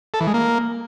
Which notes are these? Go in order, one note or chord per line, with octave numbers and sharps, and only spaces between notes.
A4
E3
G#3
A#3